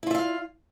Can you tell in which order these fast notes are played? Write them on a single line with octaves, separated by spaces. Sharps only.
E4 F4 E5 F5